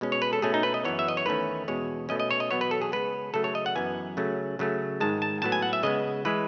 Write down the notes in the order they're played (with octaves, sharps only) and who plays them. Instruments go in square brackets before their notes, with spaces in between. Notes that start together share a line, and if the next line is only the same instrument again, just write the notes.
[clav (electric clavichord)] B2 G#3 C#4
C#5
B4
A4
B2 A3 C#4 G#4
D#4
B4
D#5
F#2 E3 B3 C#5
E5
D#5
C#5
E2 D#3 A3 C#4 B4
E2 B2 G#3 C#4 C#5
B2 A3 C#4 D#5
D#5
C#5
D#5
E2 B2 F#3 B3 C#5
B4
A4
G#4
C#3 G#3 B3 B4
C#3 F#3 A3 A4
C#5
D#5
F#5
F#2 E3 B3 G#5
C#3 F#3 A3 C#4
C#3 F#3 A3 C#4
G#2 D#3 G#3 A5
A5
A2 F#3 B3 A5
G#5
F#5
E5
C#3 G#3 B3 D#5
E3 G#3 B4